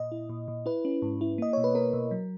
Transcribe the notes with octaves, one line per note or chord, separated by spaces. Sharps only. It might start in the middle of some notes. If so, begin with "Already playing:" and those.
Already playing: A#2 D#5
E4
A#2
A#2
E4 B4
C#4
G#2
E4
A#3 D#5
B2 C#5
B4
A#3 A#4
B2
F#3